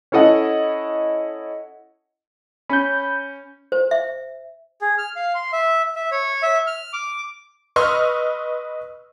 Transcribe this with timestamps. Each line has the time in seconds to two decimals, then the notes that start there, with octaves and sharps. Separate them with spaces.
0.12 C#4 E4 A4 D#5 F#5
2.70 C#4 B5 G6
3.72 C5
3.91 E5
4.81 G#4
4.98 F6
5.16 F5
5.35 C6
5.53 E5
5.96 E5
6.11 C#5
6.43 E5
6.67 F6
6.93 D6
7.76 B4 D#5 C6 C#6 E6 F6